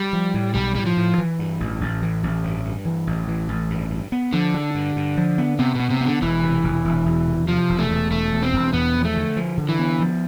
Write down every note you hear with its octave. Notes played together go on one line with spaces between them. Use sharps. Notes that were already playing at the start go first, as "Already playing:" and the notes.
Already playing: G3
F3
A2
B1 G3
A2 G3
F3
A2
E3
G2
A1
A1
E3
A1
G2
G2
E3
A1
E3
A1
G2
G2
B3
D3 F3
D4
G2
G2
F3
B3
C3 B3
B2 B3
C3
D3 B3
E1 E3
C3
E1
E1
E2
C3
C3 F3
E1
A3
E2
E1 A3
E2
C4
E1
E2 B3
F3
A3
D3
F3
D3
E3
B3
F3